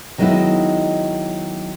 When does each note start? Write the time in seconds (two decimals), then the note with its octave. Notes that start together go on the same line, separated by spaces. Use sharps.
0.18 D#3 F#3 G#3 B3 D#4 E4